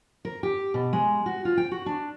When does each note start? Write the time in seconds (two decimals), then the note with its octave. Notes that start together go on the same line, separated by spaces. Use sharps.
0.25 A#4
0.43 G4
0.74 B2
0.93 G#3
1.26 F#4
1.45 F4
1.57 G5
1.71 F#4
1.86 D4